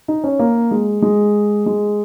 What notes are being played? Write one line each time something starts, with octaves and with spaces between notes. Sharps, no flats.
D#4
C#4
A#3
G#3
G#3
G#3